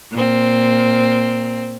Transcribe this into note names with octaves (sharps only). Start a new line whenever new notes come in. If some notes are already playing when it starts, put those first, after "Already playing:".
A#2 C4